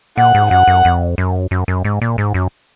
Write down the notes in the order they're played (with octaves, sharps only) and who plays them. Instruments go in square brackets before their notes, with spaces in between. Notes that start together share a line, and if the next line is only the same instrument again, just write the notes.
[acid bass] A#2 [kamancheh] F#5
[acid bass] G#2
[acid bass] F#2 [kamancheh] F#5
[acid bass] F#2
F2
F#2
F#2
F#2
G#2
A#2
G#2
F#2